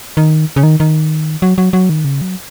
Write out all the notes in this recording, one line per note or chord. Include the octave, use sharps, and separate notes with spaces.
D#3
C#3
D#3
D#3
F#3
F#3
F#3
D#3
C#3
F#3